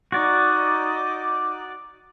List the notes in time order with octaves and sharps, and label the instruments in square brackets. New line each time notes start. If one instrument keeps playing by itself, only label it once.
[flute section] D#4 D6 [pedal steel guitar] F#4 D5